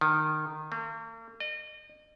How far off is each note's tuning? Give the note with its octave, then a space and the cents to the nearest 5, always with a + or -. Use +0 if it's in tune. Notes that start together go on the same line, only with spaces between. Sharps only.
D#3 -15
A#3 -45
D#5 -35